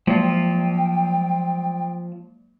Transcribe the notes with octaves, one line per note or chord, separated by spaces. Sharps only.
F3 F#3 G#3 A#3 F4 G5